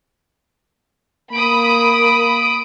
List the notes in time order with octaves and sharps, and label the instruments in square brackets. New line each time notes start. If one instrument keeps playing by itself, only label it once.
[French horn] A#3 [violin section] B5 D#6 [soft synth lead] D7